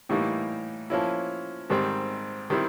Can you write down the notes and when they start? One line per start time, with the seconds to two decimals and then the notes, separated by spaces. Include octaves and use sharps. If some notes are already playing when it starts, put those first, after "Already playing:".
0.09 A2 E3 G3 A#3 D#4
0.90 F3 A#3 C#4 E4
1.70 G#2 D#3 G3 C4
2.50 D#3 G3 C4 E4